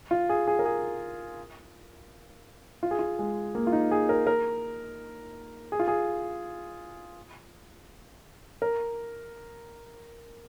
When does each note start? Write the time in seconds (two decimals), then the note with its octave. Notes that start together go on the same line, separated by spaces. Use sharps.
0.11 F4
0.29 G#4
0.48 G#4
0.59 A#4
0.65 G#4
2.83 F4
2.91 G#4
2.99 F4
3.19 G#3
3.55 A#3
3.67 F4
3.72 D#4
3.91 G#4
4.09 A#4
4.27 A#4
5.72 G#4
5.79 F4
5.88 G#4
8.62 A#4